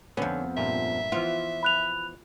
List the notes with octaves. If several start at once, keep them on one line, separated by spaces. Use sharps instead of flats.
F2 D3 B3 C#4
G2 A#2 E5
E3 F3 B3 F4
B5 F#6 F7